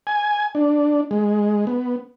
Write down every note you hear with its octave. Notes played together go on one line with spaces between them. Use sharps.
G#5
D4
G#3
B3